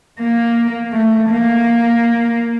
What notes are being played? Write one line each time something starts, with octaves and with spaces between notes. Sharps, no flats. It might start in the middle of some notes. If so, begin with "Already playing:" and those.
A#3
A3
A#3